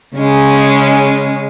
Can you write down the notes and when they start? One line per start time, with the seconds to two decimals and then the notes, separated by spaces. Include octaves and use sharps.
0.15 C#3 G#3 C#4